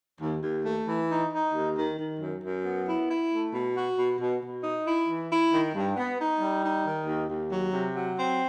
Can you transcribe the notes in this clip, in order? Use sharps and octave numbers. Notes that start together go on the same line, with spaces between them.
D#2
D#2
A3
E3
D#4
D#4
D#2
D#3
D#3
F#2
F#2
B3
E4
E4
A3
B2
F#4
B2
B2
B2
D#4
E4
E3
E4
D#3
G2
B3
D#4
G3
D#4
D#3
D#2
D#2
F#3
C3
F#3
C4